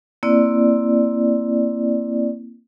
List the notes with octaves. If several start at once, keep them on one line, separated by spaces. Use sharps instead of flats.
A#3 C4 E4 D5